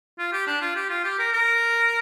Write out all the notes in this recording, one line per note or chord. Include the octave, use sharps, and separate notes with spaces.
F4
G4
D4
F4
G4
F4
G4
A#4
A#4